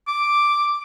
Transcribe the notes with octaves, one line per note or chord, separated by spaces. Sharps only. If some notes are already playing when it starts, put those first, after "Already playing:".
D6